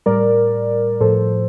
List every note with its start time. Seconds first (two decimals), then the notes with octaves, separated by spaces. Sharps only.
0.06 A2 G3 A#4 D5
1.00 A2 F3 A4 C5